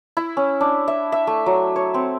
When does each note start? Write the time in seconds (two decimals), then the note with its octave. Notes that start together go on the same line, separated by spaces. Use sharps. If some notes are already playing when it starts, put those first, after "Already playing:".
0.17 E4
0.37 C#4
0.61 D4
0.88 E5
1.12 E5
1.27 A3
1.46 F#3
1.76 C#5
1.94 C4